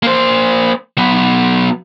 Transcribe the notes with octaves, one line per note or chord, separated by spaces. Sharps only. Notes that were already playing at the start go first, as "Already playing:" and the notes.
A#3 C5
F#3 B3